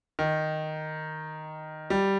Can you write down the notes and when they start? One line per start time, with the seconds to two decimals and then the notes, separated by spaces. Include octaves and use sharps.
0.19 D#3
1.90 G3